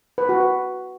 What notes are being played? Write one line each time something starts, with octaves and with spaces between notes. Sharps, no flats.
B4
F#4
B4